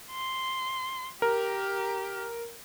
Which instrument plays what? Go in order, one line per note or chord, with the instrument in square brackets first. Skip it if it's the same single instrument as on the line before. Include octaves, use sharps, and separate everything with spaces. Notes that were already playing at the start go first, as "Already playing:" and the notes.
[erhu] C6
[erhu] G4 [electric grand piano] A#4